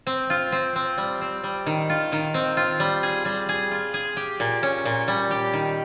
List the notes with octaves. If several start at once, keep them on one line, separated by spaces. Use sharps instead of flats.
C4
F4
C4
C4
G3
C4
G3
D#3
F4
D#3
C4
F4
G3
G#4
G3
G#4
F4
G#4
G4
A#2
C#4
A#2
G3
G4
D#3